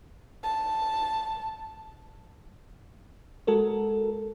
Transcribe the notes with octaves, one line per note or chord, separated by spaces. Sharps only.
A5
G#3 F#4 A4 A#4